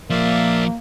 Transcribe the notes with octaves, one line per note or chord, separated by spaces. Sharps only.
A#2 F3 A#3 D5 E5 F5